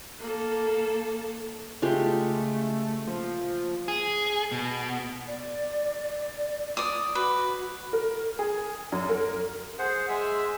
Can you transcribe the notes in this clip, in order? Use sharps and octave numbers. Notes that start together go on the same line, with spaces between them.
A#3 A4
C#3 G#3 A3 F4 G4
F3 A#3
G#4
B2
D5
D5 D#6
F#4 B4
A#4
G#4
F#2
A#4
G#4 C5 F#5
G#3 G#4 E5 E6